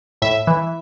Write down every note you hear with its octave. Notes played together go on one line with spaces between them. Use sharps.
A2 E5
E3